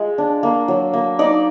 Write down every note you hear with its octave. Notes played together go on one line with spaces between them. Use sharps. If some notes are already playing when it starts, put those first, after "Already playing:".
Already playing: G#3 F4
D4
A#3
F#3
A#3
D#4 D5